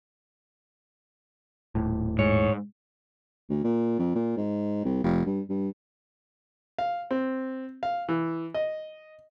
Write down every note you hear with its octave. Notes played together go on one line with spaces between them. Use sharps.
D#1 A2
G#2 C#5
D2
A#2
F2
A#2
G#2
C2
F1
G2
G2
F5
C4
F5
E3
D#5